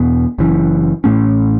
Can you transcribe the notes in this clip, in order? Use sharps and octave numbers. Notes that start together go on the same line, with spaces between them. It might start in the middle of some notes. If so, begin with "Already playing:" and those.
Already playing: E2 B2 B3
F#1 F#2 E3 C#4
A1 A2 A3 C#4